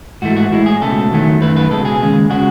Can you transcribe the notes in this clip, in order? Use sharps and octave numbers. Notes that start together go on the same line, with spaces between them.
G#2 E3 A3 F#4
F#4
A2 G#3 E4
G#4
C#2 B2 A3 A4
E2 D#3 F#3 A3
F#2 D#3 A3 B4
B4
C#2 B2 G#3 A4
G#4
D#2 C#3 G#3
C#3 G#3 F#4